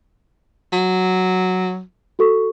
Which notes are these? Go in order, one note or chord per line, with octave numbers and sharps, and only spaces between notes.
F#3
F#4 A4 C#6